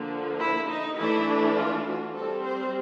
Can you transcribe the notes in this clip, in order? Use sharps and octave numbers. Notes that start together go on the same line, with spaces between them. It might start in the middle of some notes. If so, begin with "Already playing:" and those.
Already playing: D3 F3 A#3
E4
D#4
E3 A3 D4 E4
F4
F#4
G3 C4 A4
C5